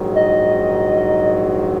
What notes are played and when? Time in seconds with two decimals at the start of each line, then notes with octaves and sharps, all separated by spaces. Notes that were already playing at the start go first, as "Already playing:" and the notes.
Already playing: A#1 G#2 D#3 F#3
0.16 D#5